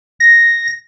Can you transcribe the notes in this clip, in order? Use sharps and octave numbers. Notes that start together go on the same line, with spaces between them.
A#6